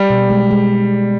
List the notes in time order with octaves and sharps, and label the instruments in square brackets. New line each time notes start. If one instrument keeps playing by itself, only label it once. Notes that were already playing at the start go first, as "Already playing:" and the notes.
Already playing: [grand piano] G3
[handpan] B2
G#3
G#3